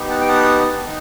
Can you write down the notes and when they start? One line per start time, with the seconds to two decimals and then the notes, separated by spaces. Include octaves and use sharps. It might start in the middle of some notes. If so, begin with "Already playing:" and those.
Already playing: B3 D#4 G4
0.10 F#5 A5
0.21 G5
0.29 F#5 A5
0.85 D#4